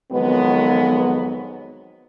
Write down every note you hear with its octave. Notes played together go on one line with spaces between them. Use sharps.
F2 D#3 F#3 G#3 B3